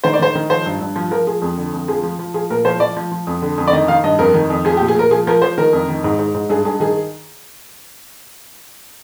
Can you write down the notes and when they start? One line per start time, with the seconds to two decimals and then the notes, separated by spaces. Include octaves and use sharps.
0.04 D#3 C5
0.14 D5
0.19 D#3 C5
0.35 D#3
0.50 F3 C5
0.66 G2
0.81 G2
0.96 F3
1.11 F3 A#4
1.27 F3 G#4
1.42 F2
1.58 D3
1.73 F2
1.88 F3 G#4
2.03 F3
2.19 F3
2.34 F3 G#4
2.50 A#2 A#4
2.65 F3 C5
2.80 F3 D5
2.96 F3
3.12 F3
3.27 F2
3.42 D3
3.58 F2
3.67 D5
3.73 D#3 D#5
3.88 D#3 F5
4.04 G2 D#5
4.19 F2 A#4
4.34 D#3
4.50 F2
4.65 F3 G#4
4.77 G4
4.81 A#2
4.88 G#4
4.95 A#2 A#4
5.11 F3 G#4
5.27 F3 A#4
5.42 F3 C5
5.58 D#3 A#4
5.73 F2
5.89 D#3
6.04 G#2
6.19 G#2
6.34 G#2
6.49 G2 G#4
6.65 G2 G#4
6.80 D#3 G#4